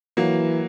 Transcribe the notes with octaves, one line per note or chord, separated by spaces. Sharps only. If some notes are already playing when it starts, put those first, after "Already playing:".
E3 F#3 A#3